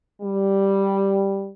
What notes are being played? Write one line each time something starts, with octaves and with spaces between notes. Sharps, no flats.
G3